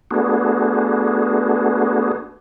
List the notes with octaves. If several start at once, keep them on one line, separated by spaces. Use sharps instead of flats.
A3 B3 D4 F#4 G#4